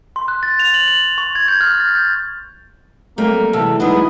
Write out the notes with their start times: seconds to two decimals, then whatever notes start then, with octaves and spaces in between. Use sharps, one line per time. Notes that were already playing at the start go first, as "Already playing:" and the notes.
0.16 C6
0.28 F#6
0.43 A6
0.60 F7
0.74 F#7
0.88 F#7
1.18 C#6
1.35 G#6
1.48 G6
1.61 F6
1.80 A6
1.95 G6
3.18 F#3 G3 A3 A#3 C4
3.53 C3 E3 G#3 A3 A4
3.80 F#3 G#3 B3 D#4 E4 G#4 B4